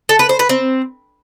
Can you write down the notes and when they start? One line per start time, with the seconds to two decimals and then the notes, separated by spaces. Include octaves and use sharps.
0.09 A4
0.19 B4
0.29 C5
0.39 B4
0.49 C4